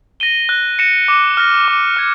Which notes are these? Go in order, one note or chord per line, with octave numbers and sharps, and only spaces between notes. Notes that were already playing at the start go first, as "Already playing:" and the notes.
A#6 D#7 G7
F#6
A#6 C#7 E7
D6
F6 A#6
D6
F6 G#6